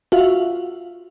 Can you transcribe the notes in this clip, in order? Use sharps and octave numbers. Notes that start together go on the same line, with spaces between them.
F4 F#4 E5 F5